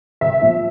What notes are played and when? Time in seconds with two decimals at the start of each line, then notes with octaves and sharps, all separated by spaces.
0.21 C2 E5
0.42 A#2 F3